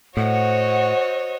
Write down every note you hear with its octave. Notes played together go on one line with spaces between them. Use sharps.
A2 F#4 C5 C#5 D#5 F#5